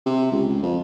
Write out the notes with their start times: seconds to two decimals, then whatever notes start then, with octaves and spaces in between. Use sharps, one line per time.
0.06 C3
0.32 C#2
0.49 C#2
0.62 F2